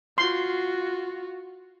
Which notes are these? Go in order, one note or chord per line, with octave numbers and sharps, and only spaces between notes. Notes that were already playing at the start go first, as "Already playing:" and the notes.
F4 F#4 C6